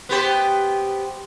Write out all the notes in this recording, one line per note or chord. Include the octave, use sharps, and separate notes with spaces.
B3 G4 C5